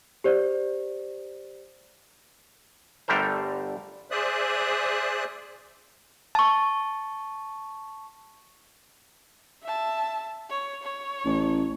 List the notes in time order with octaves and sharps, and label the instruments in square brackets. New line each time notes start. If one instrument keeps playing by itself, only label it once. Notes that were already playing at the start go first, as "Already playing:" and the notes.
[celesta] G4 C5 D5
[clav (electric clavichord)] G1 D3 G3 A3 A#4 C5
[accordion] G#4 C5 D5 E5 D#6 F#6
[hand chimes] A5 C#6
[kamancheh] E5 A5
C#5
C#5
[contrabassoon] A1